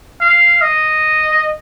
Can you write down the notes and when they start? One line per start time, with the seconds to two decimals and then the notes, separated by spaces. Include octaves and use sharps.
0.21 F5
0.61 D#5